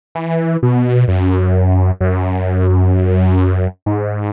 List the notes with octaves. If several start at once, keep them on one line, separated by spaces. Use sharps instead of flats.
E3
B2
F#2
F#2
G#2